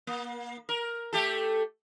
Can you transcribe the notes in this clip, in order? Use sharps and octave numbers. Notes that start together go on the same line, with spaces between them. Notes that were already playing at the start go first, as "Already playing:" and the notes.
A#3
A#4
A3 G4 A4